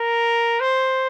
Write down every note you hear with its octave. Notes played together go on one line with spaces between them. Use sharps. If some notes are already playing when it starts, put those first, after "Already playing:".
Already playing: A#4
C5